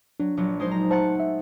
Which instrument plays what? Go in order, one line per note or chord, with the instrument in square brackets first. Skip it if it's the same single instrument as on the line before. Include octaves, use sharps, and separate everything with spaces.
[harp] F#3 [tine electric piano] D4
[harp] A#1 F#3
G#3 D#4 C5
A#5
[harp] A3 F#5 A6 [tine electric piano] C5 A5
[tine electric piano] E5